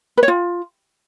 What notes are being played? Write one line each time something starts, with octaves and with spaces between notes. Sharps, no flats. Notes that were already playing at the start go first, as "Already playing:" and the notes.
B4
C#5
F4